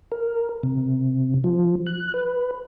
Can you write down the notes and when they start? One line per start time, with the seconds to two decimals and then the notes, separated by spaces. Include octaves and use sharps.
0.12 A#4
0.63 C3
1.44 F3
1.86 F#6
2.14 B4